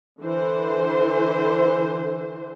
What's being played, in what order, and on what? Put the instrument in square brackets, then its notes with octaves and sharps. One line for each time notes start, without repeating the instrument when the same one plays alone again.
[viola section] D3 E3 C5